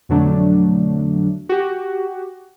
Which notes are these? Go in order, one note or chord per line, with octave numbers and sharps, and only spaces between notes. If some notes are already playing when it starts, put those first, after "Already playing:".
F2 B2 D3 F#3 A3 D4
F#4 G4